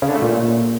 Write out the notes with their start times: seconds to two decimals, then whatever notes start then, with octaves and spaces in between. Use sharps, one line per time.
0.02 C#3
0.09 D3
0.15 A3
0.22 A#2